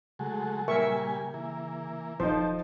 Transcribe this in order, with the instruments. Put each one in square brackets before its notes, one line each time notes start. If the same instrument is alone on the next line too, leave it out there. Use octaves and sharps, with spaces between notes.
[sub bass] C#3 [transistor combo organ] F#3 G#3 A3
[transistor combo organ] A#2 G3 G#5 [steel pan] A#4 E5 C#6
[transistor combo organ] E3 A#3
[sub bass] D#1 [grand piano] F3 D#4 [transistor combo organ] A4 [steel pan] C5